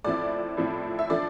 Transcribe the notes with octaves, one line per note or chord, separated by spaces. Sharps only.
A2 F3 C4 E4 D5
A2 F3 C4 E4
E5
F3 A3 D4 D5